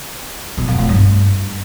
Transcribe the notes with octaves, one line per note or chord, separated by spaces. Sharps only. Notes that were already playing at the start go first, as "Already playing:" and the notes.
B2
F2
A2
G2